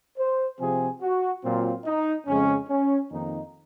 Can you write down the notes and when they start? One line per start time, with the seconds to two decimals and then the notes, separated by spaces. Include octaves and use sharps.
0.18 C5
0.60 C3 F3 C4 G#4
1.02 F#4
1.44 A#2 F#3 C4 F4
1.85 D#4
2.27 F2 C#3 G#3 C#4
2.69 C#4
3.11 F2 D#3 A#3 D#4